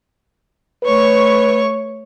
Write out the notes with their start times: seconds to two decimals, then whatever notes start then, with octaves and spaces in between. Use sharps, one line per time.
0.84 A3 B4 C#5 C#6